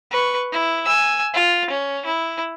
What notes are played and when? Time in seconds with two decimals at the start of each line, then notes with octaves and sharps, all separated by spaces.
0.10 B4 C#6
0.52 E4
0.85 G#5 E6
1.34 F4
1.70 C#4
2.05 E4